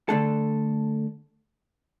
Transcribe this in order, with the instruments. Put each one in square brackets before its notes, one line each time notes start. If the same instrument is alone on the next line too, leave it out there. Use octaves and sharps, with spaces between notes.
[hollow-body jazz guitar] D3 A3 D4 A4